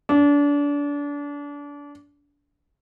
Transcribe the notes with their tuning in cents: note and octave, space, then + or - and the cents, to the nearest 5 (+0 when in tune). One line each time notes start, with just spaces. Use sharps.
D4 -30